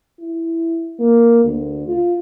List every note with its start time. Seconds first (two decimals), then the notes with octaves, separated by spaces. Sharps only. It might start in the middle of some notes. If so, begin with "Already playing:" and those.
0.20 E4
1.00 A#3
1.45 D2
1.88 F4